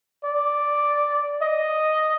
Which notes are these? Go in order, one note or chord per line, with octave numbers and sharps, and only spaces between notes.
D5
D#5